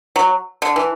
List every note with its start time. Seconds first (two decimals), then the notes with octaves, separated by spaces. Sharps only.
0.16 F#3
0.62 D3
0.76 E3